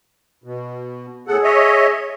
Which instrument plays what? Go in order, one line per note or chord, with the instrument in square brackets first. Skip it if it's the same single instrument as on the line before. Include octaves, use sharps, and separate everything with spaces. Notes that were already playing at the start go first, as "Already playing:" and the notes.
[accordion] B2
[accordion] A2 A4 F#5 [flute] G#4
[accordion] C#5 D#5 E5